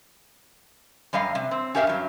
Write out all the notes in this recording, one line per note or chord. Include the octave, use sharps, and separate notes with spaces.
F#2 G3 D#5 F5
C3
C4
C#4 G4 A#4 E5 F5
G2 F#3